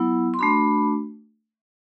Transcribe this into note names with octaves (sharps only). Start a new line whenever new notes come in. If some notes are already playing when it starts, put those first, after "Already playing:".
Already playing: F#3 B3 E4
C6
A3 D4 F#4 B5